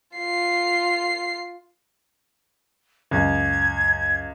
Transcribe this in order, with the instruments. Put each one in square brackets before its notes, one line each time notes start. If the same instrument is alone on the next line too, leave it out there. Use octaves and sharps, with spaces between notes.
[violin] F4 C7
[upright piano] C#2 [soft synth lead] F#2 [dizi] G#6